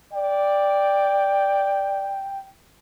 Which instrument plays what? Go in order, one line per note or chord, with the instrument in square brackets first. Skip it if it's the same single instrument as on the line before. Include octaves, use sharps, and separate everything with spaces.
[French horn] D5 [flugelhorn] G5